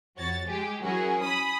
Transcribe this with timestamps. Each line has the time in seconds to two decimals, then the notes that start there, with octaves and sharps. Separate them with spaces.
0.17 F2 F#4 C#5 A6
0.47 G#3 G4 G#4
0.84 F#3 C#4 E4 F#4 G#4 A#4
1.22 G#5 B5 D#6